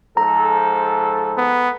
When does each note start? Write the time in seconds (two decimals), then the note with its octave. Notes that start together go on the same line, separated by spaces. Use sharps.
0.17 G#2 F3 A4 A#5
1.37 B3